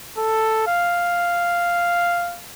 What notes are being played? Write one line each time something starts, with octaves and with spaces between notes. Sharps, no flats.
A4
F5